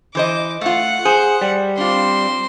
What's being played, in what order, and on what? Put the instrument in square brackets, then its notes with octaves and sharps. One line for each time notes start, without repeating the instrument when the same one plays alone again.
[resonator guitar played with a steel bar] E3 C5 D#5 [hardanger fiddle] D6
[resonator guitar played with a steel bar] A3 F4 [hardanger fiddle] F#5
[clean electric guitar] G#4 [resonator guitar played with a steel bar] C5
[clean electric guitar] G3
[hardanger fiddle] C4 C6 [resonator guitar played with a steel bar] D4 F4